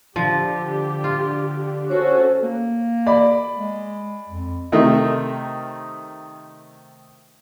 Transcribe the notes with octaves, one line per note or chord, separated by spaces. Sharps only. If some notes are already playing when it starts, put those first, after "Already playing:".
D3 F3 G4
F4
C#4 F#4 A4 C5 C#5
A#3
D5 B5
G#3
F2
C3 D#3 A3 D#4 A#4